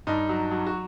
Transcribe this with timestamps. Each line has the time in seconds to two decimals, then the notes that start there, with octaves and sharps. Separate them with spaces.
0.07 G2 D#4
0.29 F#3
0.51 F#3
0.67 F#4